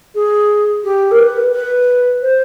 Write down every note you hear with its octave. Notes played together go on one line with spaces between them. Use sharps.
G#4
G4
A#4
B4
B4
C5